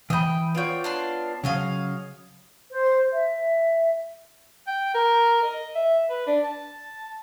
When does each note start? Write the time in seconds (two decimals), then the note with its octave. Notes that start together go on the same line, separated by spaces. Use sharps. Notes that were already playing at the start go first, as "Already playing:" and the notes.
0.10 E3 D#5 G5 B5
0.55 B3 F4 C#5 D5 G5
0.84 D4 A5 C6
1.44 C#3 F#3 C#5 D#5 F5
2.71 C5
3.13 E5
4.67 G5
4.94 A#4
5.43 D#5
5.75 E5
6.10 B4
6.26 D4
6.44 A5